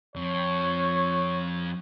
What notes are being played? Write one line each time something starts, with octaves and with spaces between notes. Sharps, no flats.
F2 C#5